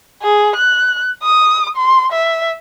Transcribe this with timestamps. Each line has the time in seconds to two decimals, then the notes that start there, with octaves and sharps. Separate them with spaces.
0.22 G#4
0.56 F#6
1.23 D#6
1.77 C6
2.13 E5